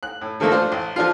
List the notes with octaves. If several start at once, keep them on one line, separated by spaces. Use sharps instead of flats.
F#6
A2
D3 F3 A3 A#3 D#4
D4 F4 C5
A1
F3 D4 F4